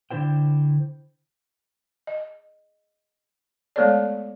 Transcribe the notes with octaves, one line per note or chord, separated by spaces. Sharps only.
D3 D4 E4 C5 G5
D#5
G#3 A3 B3 A4 C#5 D5